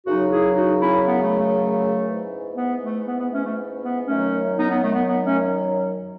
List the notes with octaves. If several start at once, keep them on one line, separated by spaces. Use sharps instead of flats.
F#2 C#3 F#3 D#4 F#4
E4 G#4
D#4 F#4
C#4 E4
B3
A3
A3
G#2 E3
B3
A3
B3
B3
A3 C#4
A3
B3
F#2 D#3 F#3 A3 C#4
B3 D#4
B3
A3
B3
B3
A3 C#4